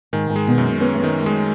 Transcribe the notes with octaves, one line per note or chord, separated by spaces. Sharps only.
G#2 D#3
G#2
G#3
B2
F#2
B3 C#4
A3
D#3 G#3
G#3 A3